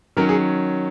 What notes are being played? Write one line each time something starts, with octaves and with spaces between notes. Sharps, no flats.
D#3 F#3 C#4 A#4
G#4